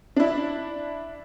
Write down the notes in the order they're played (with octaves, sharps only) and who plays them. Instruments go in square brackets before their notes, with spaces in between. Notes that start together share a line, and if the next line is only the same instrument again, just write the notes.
[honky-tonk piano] D4 E4